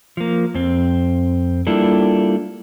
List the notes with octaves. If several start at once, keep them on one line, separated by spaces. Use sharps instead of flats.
F3 A#3
F2 C4
G3 A#3 D4 E4 F4 A4